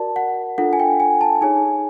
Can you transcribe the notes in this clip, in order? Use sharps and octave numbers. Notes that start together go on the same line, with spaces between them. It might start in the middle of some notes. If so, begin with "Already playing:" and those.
Already playing: F#4 A#4 D5 A5
F#5
D4 F4 A4 F#5
G#5
G5
G#5
A5
D#4 G#4 C#5 G#5